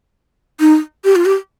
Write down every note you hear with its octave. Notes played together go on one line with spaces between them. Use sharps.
D#4
G4
F4
G4